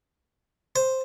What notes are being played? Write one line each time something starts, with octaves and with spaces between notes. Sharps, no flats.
C5